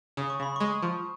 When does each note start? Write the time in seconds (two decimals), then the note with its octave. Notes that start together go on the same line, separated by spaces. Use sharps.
0.17 C#3 D#6
0.30 C#6
0.40 C#3 B5
0.56 G#3 C#6
0.83 F3